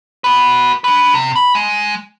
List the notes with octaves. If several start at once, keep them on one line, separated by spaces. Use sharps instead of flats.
F#4 B4
D4 B4
C3
B5
G#3